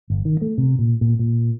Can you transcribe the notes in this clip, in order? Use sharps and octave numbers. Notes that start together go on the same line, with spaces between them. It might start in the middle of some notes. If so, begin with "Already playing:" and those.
G1
D#3
A3
C3
A#2
A#2
A#2